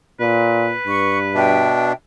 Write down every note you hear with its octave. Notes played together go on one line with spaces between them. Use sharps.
A#2 B4
G2 C#6
B2 D4 E5 G5